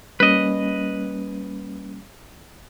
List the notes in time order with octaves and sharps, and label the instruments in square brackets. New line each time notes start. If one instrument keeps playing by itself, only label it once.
[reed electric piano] G3 A#3 C#4 [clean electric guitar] B4 D#5